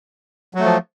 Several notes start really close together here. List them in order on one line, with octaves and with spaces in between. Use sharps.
F#3 A3 F3